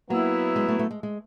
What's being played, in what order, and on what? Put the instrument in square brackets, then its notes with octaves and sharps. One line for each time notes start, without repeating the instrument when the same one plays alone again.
[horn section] F#3 B3 E4 [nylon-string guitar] A#3
[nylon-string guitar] G#3
A3
A3
G#3
G#3